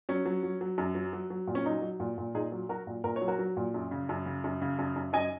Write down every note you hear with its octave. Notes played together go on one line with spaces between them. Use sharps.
F#3 C#4
F#3
F#3
F#3
F#2
F#3
F#3
F#3
A#2
C#4
F#3 D#4
F#3
A#2
A#2
A#2 D#4 G#4
F#3
F#3 F#4 A#4
A#2
A#2 A#4
C#5
F#3
F#4 A#4
F#3
A#2
F#2
C#3
F#2
C#3
F#2
C#3
F#2
F#2
F#2 D#5 G#5